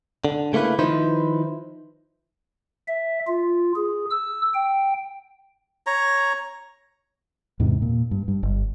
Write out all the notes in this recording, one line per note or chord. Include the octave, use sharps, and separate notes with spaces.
D3
C#3 A3 A#3 E4 B4
D#3 F3 D#4 E4 B4 C5
E5
F4
G#4
E6
G5
C#5 A#5
E2 G#2 C3
A#2
G2
G2
G1